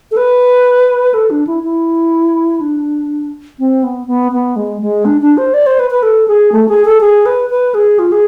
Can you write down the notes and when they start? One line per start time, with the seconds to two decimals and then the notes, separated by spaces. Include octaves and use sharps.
0.11 A4
0.17 B4
1.14 A4
1.31 D4
1.47 E4
1.63 E4
2.61 D4
3.59 C4
3.83 B3
4.07 B3
4.32 B3
4.56 G#3
4.82 G#3
5.05 D4
5.22 D4
5.38 C5
5.54 D5
5.66 C5
5.79 B4
5.91 B4
6.03 A4
6.28 G#4
6.52 A3
6.69 G#4
6.85 A4
7.01 G#4
7.26 B4
7.50 B4
7.74 G#4
7.99 F4
8.12 G#4